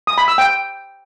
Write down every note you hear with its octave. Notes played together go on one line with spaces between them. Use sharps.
D#6
B5
E6
G5